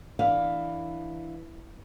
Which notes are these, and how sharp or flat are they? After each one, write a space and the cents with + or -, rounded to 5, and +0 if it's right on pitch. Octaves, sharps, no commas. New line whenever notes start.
E3 +0 D4 +10 F5 +5